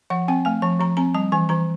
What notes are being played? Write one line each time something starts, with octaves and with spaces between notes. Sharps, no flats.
F3 F#5
C4 G5
A3 G#5
F3 A5
F3 A#5
C4 A#5
G3 A5
E3 G#5
E3 A#5